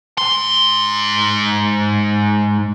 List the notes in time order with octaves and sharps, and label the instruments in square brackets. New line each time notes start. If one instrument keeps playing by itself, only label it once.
[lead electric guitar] G#2 C6